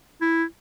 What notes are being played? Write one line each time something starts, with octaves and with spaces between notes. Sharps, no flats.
E4